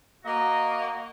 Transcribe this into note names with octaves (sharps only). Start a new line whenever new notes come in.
A#3 F#4 D#5